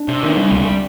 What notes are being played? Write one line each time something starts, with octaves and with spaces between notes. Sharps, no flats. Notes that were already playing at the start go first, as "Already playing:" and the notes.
Already playing: D4
C3
D#3
G3
C#2